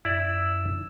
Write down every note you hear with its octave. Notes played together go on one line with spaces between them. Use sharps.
F#2 E4 D5 E6